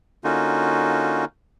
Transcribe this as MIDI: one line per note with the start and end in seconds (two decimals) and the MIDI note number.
0.24 1.25 50
0.24 1.25 58
0.24 1.25 61
0.24 1.25 63
0.24 1.25 65
0.24 1.25 66